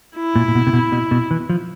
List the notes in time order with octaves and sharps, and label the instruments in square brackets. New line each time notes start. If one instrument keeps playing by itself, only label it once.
[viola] E4
[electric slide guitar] A#2
A#2
B2
C3
B2
B2
B2
E3
F3